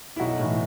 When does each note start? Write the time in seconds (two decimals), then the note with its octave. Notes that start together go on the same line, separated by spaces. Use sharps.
0.16 E4
0.20 B1 D#4 F#4
0.39 A2 E3